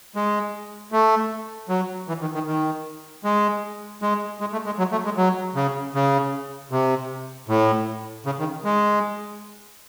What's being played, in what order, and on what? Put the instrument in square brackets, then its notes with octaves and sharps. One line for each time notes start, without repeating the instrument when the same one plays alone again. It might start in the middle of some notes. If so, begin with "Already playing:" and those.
[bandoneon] G#3
A3
F#3
E3
D#3
D#3
D#3
G#3
G#3
G#3
A3
G#3
F#3
A3
G#3
F#3
C#3
C#3
C3
A2
C#3
D#3
G#3